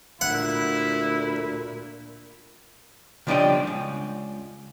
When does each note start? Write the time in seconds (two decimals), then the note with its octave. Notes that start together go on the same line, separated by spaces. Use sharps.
0.21 D2 A#2 E4 F#5
3.27 C#3 F3 G3 D4 D#5 G5
3.67 C#2